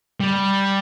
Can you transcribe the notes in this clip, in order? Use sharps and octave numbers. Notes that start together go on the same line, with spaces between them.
G3